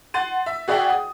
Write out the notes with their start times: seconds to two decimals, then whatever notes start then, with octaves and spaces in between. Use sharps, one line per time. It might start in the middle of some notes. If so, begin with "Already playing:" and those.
0.14 F#5 C6 A6 D#7
0.46 E5
0.68 F#4 G#4 D5 E5 F#5 G5
0.90 D#6